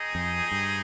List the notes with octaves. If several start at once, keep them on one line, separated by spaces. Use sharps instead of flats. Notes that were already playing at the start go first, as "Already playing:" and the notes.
Already playing: C4 D#4 G#4 D#5
F2
G2